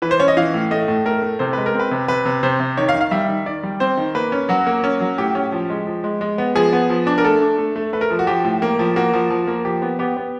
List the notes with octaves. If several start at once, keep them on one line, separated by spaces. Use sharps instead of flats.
E3 B4
C5
C#4 C#5
D#5
E3 F5
A2
A3 D#5
A2
A3 A#4
A3
C3 C5
G#3 B4
A#4
C4
B4
C3
C3 B4
C3
C3 C5
C3
D#3 C#5
F5
D#3
F5
G3 E5
D#3
D#3 D5
G3
C4 C5
D#3
A#3 B4
C#4
F#3 F#4
A#3
C#4
F#3
A2 G4
C#4
F3
G#3
F3
G#3
G#3
B3
F3 G#4
B3
F3
D4
A#4
A3 A4
D4
A3
A3
A3 B4
A#4
F3
F#4
F3 G4
A2
A#3
F3
A#3 F#4
F3
F3
A#3
F3 G4
B3
B3 G4
B3